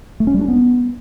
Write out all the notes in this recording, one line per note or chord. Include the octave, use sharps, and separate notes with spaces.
A3
C#4
G3
D4
B3